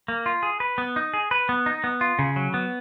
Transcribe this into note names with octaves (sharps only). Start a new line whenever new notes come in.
A#3
F4
G#4
B4
B3
D#4
G#4
B4
B3
D#4
B3
F4
C#3
F#3
B3